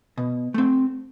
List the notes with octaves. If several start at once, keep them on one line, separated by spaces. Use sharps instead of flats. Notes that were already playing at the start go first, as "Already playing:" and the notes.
B2
A3 C4